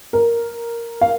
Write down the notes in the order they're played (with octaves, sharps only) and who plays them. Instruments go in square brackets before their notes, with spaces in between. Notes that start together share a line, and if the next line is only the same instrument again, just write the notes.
[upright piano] A#4
F5